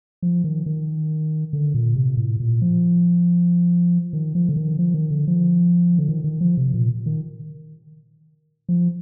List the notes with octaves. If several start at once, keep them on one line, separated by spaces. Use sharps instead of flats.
F3
D#3
D#3
D3
A#2
C3
A2
A#2
F3
D#3
F3
D3
D#3
F3
D#3
D3
F3
D3
D#3
D#3
F3
C3
A#2
D#3
F3